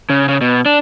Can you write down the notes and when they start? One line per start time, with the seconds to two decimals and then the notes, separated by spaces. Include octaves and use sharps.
0.10 C#3
0.28 C#3
0.41 B2
0.66 D4